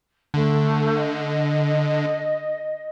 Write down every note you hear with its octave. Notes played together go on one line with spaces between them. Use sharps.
D3 A3
D#5